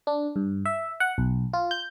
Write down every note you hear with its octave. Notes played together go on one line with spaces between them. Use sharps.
D4
G2
E5
F#5
B1
F4
G6